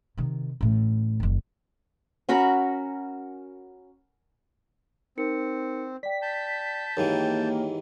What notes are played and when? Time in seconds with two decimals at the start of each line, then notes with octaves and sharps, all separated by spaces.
0.17 C3 D#3
0.61 A1 A2
1.20 F#1 D#3
2.29 C#4 F#4 A#4 B5
5.17 C4 D#4 A#4 C#7
6.03 D5 G5 B6
6.22 A5 G6
6.97 D#2 G#2 E3 A#3 C#5 G5